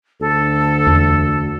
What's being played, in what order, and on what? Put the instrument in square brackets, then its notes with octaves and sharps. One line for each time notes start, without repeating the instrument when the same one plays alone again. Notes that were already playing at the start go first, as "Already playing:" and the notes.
[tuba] D2 [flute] A4
[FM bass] E2